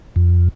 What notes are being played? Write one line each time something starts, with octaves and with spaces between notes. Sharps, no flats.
F2